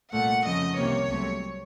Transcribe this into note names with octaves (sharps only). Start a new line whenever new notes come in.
C2 A#2 A3 F#5
F2 C#3 F3 A3 D#5
C2 C3 D#3 A#3 C#5
C2 C3 F#3 A3